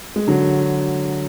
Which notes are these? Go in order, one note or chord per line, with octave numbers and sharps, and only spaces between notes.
G#3
D3 F#3